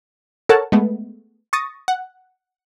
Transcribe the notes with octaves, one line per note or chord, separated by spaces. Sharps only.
A4 A#4 C#5 F#5 A5
G#3 A3 B3
C#6 D#6 A6 A#6
F#5